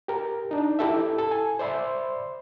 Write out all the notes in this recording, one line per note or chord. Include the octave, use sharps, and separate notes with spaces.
G4 A#4
D4 D#4
E4 G4 A4 E5
A4
G#5
C5 D5 E5 B5 C6